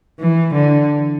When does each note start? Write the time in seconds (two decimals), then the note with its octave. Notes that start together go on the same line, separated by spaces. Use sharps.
0.20 E3
0.55 D3